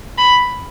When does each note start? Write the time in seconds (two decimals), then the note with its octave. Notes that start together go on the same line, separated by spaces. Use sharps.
0.18 B5